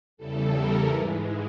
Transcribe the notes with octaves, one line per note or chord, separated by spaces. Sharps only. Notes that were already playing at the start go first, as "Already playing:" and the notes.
E2 C#3 E3 G3 A4
A#4
G#2 E3 G#3 B4